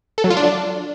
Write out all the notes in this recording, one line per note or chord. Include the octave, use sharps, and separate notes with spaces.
A4
F#3
F4
D4